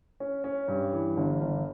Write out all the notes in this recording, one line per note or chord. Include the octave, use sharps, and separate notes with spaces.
C#4
C#4
G2
E3
G1
G1